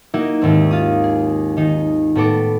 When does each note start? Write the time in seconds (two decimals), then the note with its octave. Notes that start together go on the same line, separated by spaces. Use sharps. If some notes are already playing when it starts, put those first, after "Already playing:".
0.14 A#3 D#4 E4 F#4
0.41 D#2 G#2 C4
0.71 F4 D#6
1.04 G#4
1.57 D#3 D#4
2.15 A2 B3 F#4 A4 D6